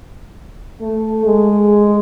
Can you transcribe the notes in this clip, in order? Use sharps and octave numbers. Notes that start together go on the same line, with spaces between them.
A3
G#3